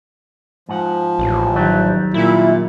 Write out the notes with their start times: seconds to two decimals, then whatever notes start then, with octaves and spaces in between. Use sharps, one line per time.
0.69 G#2 F3 F#5
1.19 A1
1.55 D#3 F#3 G3
2.14 A#2 E4